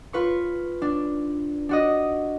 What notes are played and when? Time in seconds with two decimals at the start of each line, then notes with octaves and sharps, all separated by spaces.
0.13 F4 B4 C#6
0.82 D4
1.69 D4 F#4 D#5